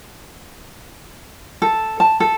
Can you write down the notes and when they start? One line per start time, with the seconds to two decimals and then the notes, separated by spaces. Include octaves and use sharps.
1.62 A4
2.00 A5
2.20 A4